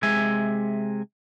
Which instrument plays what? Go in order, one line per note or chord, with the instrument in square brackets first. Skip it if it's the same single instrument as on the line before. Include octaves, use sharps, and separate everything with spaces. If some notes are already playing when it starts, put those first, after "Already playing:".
[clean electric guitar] C3 G#3 E5 G#5